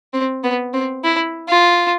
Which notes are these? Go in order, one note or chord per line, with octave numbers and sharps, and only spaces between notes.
C4
B3
C4
E4
F4